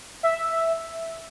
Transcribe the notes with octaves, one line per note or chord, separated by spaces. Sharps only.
E5